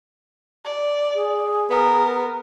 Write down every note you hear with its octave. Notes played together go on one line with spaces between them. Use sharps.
D5
G#4
B3 A#4